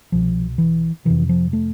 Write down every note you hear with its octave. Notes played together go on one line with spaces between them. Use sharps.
C2 B2 F3
E3
F2 C3 E3
F3
A3